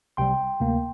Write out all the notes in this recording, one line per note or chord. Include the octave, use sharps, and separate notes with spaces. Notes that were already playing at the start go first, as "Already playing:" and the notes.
C2 C3 G3 G5 C6
D2 C3 A#3